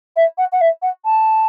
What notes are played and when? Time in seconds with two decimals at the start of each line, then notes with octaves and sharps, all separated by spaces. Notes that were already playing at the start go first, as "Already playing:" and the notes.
0.16 E5
0.38 F#5
0.52 F#5
0.61 E5
0.82 F#5
1.05 A5